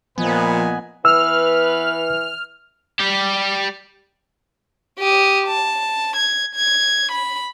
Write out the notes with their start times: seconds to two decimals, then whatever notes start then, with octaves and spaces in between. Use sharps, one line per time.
0.18 A#2 F3 B3 B4 D#5 G#5
1.05 E3 B3 B4 E6 F6
3.00 G3 G4
4.99 G4 D#6
5.47 A5
6.16 G#6
6.55 G#6
7.12 B5